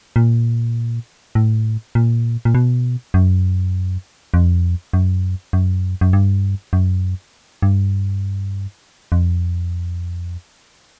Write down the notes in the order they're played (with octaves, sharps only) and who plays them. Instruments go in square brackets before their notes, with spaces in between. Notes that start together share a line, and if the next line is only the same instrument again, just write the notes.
[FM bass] A#2
A2
A#2
A#2
B2
F#2
F2
F#2
F#2
F#2
G2
F#2
G2
F2